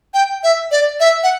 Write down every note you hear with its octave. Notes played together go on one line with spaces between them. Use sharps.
G5
E5
D5
E5
F#5